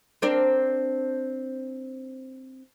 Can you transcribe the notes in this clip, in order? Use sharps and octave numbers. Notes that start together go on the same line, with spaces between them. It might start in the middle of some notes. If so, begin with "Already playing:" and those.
C4 D4 A#4